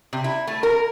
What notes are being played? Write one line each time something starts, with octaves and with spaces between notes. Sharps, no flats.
C3
E4
A3
A#4